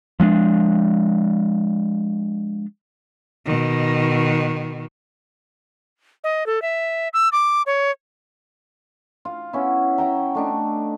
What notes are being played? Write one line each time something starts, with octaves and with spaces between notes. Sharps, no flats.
F3 G#3 C#4 D4
B2 D#3
D#5
A4
E5
E6
D6
C#5
F4
B3 C#4 E4
E5 F#5 G5 A#5
A3 D4 D#4